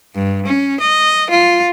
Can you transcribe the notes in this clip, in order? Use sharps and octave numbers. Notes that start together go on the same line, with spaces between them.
G2
C#4
D#5
F4